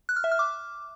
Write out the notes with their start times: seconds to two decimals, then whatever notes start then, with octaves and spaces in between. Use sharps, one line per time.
0.09 F#6
0.16 F6
0.24 E5
0.32 F6
0.39 D6